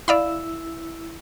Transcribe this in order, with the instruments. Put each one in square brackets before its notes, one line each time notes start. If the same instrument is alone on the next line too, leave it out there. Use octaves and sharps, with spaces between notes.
[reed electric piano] E4 E6 [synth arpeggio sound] D5 F5 B5